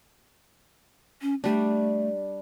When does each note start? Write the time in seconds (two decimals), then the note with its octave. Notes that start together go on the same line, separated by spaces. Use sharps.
1.22 C#4
1.44 G3 A3 D4